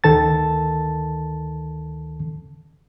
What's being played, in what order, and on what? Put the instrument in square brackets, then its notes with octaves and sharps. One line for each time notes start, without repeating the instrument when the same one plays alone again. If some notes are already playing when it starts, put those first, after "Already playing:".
[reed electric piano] D2 D#3 A4 A5 A6